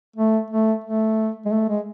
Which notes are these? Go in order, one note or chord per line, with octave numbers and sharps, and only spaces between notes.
A3
A3
A3
G#3
A3
G#3